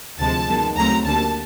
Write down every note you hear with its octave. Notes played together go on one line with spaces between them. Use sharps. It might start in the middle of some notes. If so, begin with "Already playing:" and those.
D2 C3 F3 G#3 A5
F#2 D#3 G#3 B3
D2 C#3 F#3 A3 C4 A#5
D2 D3 G3 A#3 A5